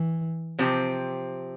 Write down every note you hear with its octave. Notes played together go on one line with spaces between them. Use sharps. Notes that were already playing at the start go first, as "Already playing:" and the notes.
Already playing: E3
C3 F3 C4 G4